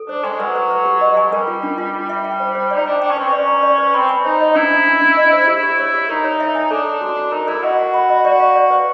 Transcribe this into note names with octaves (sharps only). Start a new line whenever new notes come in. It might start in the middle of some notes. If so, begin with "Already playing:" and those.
Already playing: A4
D4 C5
G#3 G#5
F#3 B4
B4
B4
G4
D#5
F#3 G#5
G#3
G3 A#4
F4
D4
F4
F4
G3 E5
G5
C5
C5
D5
D#4
D4 G5
D4 G5
C#4
C4 B4
C#4 D5
A#5
D5
B4
C4 B5
G#5
D#4 C5
D#5
D4 E4
D4
D4
D4
D#5
C5
E4 G4
G4
C#5
G4
D#4 A#4
C#5
E5
G#5
D4 A4
G#5
F#4
F#4
D#4 A#4
E4 A#4
F#4 D#5
F#5
B5
D#5
F#4 D5
F5
D5
B4